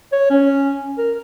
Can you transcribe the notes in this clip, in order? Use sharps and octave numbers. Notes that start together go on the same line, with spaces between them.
C#5
C#4
A#4